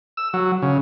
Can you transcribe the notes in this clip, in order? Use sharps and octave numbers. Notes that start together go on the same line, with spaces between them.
E6
F#3
C#3